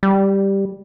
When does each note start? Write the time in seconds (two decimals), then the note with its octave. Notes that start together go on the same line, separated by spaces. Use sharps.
0.03 G3